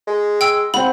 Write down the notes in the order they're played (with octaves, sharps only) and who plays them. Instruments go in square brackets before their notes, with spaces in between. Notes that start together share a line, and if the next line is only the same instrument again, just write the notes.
[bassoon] G#3
[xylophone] G5 E6
[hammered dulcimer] C4 F#5 [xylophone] B5